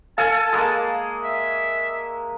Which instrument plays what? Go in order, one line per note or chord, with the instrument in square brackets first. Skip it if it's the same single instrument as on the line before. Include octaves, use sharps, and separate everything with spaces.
[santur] A4 G#5 [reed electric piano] F5 [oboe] A5
[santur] G#3 A#3
[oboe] E5